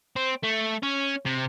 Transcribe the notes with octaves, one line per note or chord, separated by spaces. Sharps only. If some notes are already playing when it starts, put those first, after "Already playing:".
C4
A3
C#4
C3